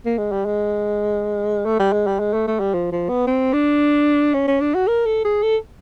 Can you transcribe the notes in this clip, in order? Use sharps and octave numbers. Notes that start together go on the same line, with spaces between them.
A#3
G#3
G3
G#3
A3
G3
G#3
G3
G#3
A3
A3
G3
F3
F3
B3
C4
D4
C#4
C#4
D4
F#4
A#4
A4
G#4
A4